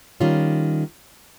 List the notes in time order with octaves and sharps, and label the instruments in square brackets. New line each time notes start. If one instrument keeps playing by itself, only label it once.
[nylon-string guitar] D#3 G3 C#4 F4